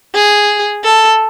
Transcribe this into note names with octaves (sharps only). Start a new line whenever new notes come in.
G#4
A4